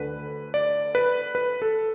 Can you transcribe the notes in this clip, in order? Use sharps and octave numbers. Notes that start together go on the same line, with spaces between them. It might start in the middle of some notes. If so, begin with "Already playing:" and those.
Already playing: D2 D3 B4
D5
B4
B4
A4